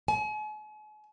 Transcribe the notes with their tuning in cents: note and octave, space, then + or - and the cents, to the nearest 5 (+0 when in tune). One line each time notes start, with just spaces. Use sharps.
G#5 +40